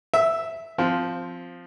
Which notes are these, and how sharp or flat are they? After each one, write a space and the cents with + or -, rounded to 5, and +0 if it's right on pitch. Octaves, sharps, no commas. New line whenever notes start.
E5 +0 E6 -30
F3 +5 C4 -10